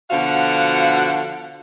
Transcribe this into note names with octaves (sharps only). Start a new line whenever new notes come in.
B2 D3 F3 F#4 F5 F#5